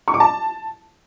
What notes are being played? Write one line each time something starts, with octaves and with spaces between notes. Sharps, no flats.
C#6
D6
A5